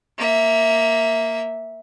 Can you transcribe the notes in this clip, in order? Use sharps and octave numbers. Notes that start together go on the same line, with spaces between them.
A#3 E5